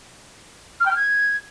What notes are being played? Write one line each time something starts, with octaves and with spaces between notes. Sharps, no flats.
F6
G5
F6
G#6